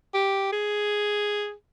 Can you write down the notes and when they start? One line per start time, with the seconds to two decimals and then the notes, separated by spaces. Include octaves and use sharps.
0.14 G4
0.52 G#4